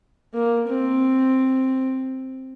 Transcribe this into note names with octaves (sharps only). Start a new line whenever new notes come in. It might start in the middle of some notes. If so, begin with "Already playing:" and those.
A#3
C4